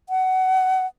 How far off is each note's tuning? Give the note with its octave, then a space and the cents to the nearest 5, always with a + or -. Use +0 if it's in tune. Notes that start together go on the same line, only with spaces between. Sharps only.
F#5 +20